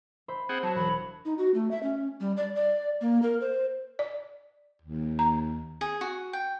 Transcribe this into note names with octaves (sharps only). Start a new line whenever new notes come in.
C5 E5 B5
C4 G#4 F#5
F#3 A5
E1 B5
D#4
F#4
A3
E5
C#4
G3
D5
D5
A#3
A#4
C5
D5
D#2
A#5
G#4
F#4
G5